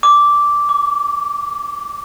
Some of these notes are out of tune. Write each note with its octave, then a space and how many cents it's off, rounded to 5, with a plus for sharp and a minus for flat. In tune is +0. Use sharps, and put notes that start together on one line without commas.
D6 -10
D6 -45